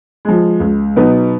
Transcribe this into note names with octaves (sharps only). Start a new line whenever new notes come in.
F3 G#3
C#2
B2 F#3 B3 D#4